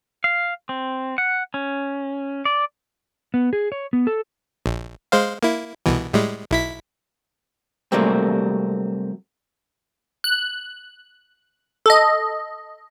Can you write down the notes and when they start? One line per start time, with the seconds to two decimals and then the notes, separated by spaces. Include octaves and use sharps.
0.24 F5
0.69 C4
1.18 F#5
1.54 C#4
2.45 D5
3.34 B3
3.53 G#4
3.72 C#5
3.93 B3
4.07 A4
4.66 A#1
5.12 G#3 C5 F5
5.43 A#3 E4
5.86 C2 B2 E3
6.13 A2 G3 G#3
6.51 B1 E4 B6
7.92 C3 F#3 G3 A3 A#3 C4
10.24 F#6
11.86 A4 D#5